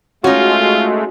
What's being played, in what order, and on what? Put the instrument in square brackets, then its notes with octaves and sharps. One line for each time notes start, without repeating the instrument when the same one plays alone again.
[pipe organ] G#3 A3 [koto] C#4 D#4 [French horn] F4 [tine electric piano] F#4